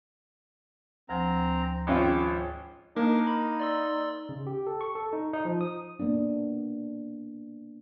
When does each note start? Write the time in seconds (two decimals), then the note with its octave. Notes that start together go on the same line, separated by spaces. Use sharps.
1.09 D2 F3 C4 G#5 A#5
1.87 G#1 C#4 F4 D6
2.96 A#3 D4 D#4 A#4 D6
3.27 B5
3.60 D5 C6 E6
4.29 C#3
4.47 G4
4.67 A4
4.81 C#6
4.95 A4
5.13 D#4
5.33 D#4
5.45 F3
5.61 D#6
6.00 A#3 B3 D4